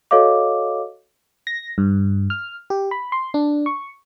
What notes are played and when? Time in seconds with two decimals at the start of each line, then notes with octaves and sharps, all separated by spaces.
0.11 F#4 A4 C#5 D#5 F5 D6
1.47 A#6
1.78 G2
2.30 F6
2.70 G4
2.91 B5
3.12 C6
3.34 D4
3.66 C#6